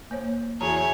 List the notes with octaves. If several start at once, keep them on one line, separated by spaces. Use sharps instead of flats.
A#3 C5 C#5
E2 E4 F#4 G#4 C#5 A5 A#5